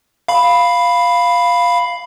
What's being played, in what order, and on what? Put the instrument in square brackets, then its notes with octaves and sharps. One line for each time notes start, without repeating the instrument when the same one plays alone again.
[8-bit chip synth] F5 B5